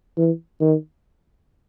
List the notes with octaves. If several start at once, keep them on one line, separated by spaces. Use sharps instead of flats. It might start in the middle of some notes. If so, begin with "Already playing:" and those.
E3
D#3